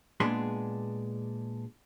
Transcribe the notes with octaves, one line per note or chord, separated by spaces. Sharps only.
A#2 G#3 B3 D4 G#4 C6